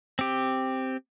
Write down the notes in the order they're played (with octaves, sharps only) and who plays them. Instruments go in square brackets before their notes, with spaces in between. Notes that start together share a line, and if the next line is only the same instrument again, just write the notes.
[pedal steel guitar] C4 G4